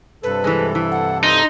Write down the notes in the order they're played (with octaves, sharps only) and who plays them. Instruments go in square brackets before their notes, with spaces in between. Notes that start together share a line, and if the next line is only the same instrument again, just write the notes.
[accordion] G2 C3 A4 [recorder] B4
[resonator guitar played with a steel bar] E3 G#3
E3
[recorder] F#5
[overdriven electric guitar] D#4 [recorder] C6